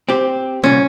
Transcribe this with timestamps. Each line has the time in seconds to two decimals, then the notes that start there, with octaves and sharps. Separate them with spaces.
0.09 C4 G4
0.64 C2 A#2 C#4